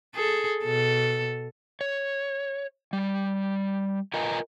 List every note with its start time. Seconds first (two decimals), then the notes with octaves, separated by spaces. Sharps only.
0.15 G#4 A4
0.64 B2 A4
1.81 C#5
2.93 G3
4.14 F4 A#4 B4 D#5 G#5 A#5